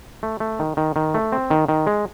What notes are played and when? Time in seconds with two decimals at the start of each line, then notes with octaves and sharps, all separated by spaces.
0.23 A3
0.40 A3
0.59 D#3
0.77 D#3
0.96 D#3
1.14 A3
1.32 C4
1.50 D#3
1.68 D#3
1.87 G#3